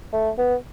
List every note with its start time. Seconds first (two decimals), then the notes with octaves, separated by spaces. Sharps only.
0.13 A3
0.38 B3